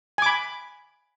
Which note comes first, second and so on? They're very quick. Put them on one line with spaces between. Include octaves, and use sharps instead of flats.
G#5 D6 B5